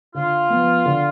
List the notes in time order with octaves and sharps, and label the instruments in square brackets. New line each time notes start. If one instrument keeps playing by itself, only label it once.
[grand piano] D3 [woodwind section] F4
[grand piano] F3 B3
D3